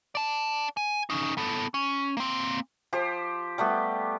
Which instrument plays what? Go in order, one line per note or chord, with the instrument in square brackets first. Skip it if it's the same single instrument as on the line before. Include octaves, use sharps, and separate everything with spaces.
[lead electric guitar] D5 A5
G#5
C#4 D#4
B3 A4
C#4
A#3 C4
[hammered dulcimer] F3 G4 C5
G3 A3 B3 G4